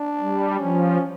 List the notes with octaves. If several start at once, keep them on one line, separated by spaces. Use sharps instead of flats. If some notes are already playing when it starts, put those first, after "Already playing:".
Already playing: D4
G3
F3 C#4